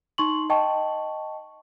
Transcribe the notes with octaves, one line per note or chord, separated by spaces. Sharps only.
D#4 C6 C#6 F#7
D#5 G5 A5 C#6